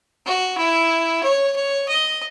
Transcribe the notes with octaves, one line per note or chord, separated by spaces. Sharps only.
F#4
E4
C#5
C#5
D#5